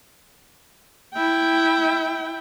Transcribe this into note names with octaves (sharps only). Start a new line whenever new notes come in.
E4 G5